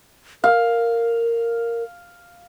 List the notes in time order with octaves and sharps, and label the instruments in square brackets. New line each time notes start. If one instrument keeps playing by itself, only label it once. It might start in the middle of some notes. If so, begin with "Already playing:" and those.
[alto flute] A#4 [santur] F5